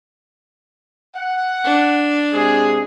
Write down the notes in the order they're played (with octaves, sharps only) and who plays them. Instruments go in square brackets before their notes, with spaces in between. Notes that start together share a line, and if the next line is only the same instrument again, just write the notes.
[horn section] F#5
[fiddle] D4
[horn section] C3 G#3 G#4